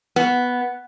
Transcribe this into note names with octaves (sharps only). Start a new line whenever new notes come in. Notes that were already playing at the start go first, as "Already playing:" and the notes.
B3